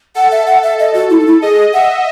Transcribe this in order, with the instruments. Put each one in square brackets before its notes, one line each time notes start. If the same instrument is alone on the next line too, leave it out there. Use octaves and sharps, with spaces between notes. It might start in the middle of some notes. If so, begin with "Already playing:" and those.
[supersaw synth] A4 [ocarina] F#5
[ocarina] E5
F#5
E5
D#5
F#4
E4
D#4
E4
[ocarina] G#4 [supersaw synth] D#5
[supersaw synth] E5 [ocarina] F#5